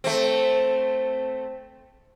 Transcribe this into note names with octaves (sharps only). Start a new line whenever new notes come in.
A3 C4